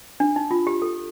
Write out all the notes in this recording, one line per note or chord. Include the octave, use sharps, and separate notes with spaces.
D4
D#4
F4
G4
A4